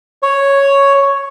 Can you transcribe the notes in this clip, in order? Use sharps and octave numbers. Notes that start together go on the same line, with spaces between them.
C#5